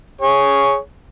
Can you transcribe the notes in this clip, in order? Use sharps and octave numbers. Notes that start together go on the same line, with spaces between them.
G#4 C#5